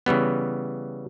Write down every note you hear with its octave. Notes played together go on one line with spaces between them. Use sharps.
C#3 E3 G3 B3